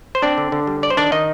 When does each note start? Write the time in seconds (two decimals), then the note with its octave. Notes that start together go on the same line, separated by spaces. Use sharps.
0.15 C5
0.22 C4 D4 D5
0.38 D3
0.52 D3
0.67 G3
0.83 D4 D5
0.90 C5
0.97 D#3 D4 D5
1.12 D#3 D#4 D#5